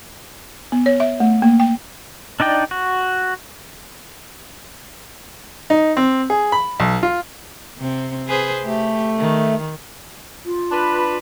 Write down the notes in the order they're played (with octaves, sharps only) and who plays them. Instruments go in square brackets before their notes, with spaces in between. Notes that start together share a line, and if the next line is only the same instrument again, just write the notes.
[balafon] B3
C#5
E5
A3
A#3
G5
[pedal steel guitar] D4 D#4 D5 G5
F#4
[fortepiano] D#4
C4
G#4
B5
B1
F4
[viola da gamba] C3 C4
G#4 B4 C5
[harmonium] A3 [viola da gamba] G4
[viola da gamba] D#3
[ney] F4
[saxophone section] D4 B4